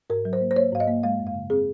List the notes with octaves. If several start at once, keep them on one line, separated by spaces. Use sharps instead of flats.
G#2 A#4
F#3
C5
A#3
C5
A#3 C#5
G#2 F5
D#5
A#3
G#3 F5
F#2
F5
C#3
C4 G#4